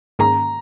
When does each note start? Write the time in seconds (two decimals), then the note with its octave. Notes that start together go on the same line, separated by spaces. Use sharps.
0.19 G#2 D#3 A#3 C#4 G#4 A#5